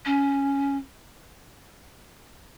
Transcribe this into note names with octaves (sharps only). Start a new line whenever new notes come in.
C#4